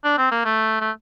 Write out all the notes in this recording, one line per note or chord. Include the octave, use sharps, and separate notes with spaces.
D4
C4
A#3
A3
A3